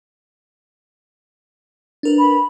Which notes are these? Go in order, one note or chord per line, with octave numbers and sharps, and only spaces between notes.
D4 A#4 B4
B5